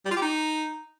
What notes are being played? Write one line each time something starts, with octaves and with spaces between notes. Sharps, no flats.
G3
F4
G4
D#4